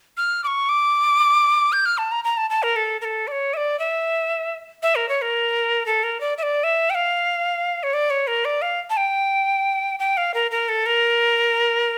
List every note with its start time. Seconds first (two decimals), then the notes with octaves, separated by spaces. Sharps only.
0.17 F6
0.44 D6
0.47 C#6
0.69 D6
1.73 G6
1.86 F6
1.98 A5
2.12 A#5
2.24 A#5
2.37 A5
2.50 A5
2.63 A#4
2.76 A4
3.01 A#4
3.05 A4
3.28 D5
3.32 C#5
3.54 E5
3.57 D5
3.79 E5
4.83 E5
4.96 A#4
5.09 C#5
5.22 A#4
5.86 A4
6.03 A#4
6.21 D5
6.38 E5
6.43 D5
6.64 E5
6.90 G5
6.95 F5
7.83 C#5
7.93 D5
8.10 C#5
8.27 A#4
8.45 D5
8.62 F5
8.90 A5
8.97 G5
9.99 G5
10.17 F5
10.34 A#4
10.51 A#4
10.69 A4
10.86 A#4